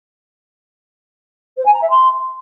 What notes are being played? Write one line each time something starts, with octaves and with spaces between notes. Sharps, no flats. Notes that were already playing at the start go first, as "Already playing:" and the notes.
C5
G#5
A#5
E5
C6